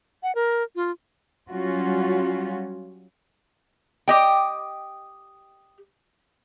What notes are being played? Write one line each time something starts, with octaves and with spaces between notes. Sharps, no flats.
F#5
A#4
F4
F#3 G3 C#4 F4 F#4
G4 D#5 G5